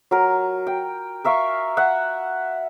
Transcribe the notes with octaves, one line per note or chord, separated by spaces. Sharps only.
F#3 A#4
G5
A#4 E5 F5 C#6
E5 F#5